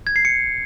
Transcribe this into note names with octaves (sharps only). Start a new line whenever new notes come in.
G#6
C7
C#7